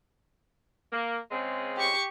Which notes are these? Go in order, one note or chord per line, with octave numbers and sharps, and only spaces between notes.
A#3
C#3 G#3 C4
G4 C#6